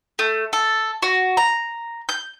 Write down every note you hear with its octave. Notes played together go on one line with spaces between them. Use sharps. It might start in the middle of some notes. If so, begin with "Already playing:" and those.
A3
A4
F#4
A#5
G6